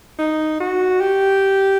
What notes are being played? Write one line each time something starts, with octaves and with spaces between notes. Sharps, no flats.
D#4
F#4
G4